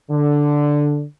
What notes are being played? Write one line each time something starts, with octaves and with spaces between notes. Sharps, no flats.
D3